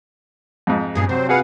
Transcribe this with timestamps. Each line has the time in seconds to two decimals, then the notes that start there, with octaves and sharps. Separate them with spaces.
0.67 F2 G#2
0.95 G2 A#2 C#4 G#4
1.09 C3 F#3 C4 C5
1.29 F#4 G#4 B4 F5 F#5